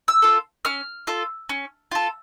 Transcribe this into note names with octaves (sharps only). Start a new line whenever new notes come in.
E6
F4 A4
C#4 F6
F4 A4
C#4
F4 A4